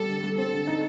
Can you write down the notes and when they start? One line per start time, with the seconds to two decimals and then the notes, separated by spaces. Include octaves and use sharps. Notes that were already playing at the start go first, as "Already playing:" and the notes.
Already playing: G3 A4
0.09 D3
0.23 G3
0.38 C4 A4
0.53 D3
0.67 D#4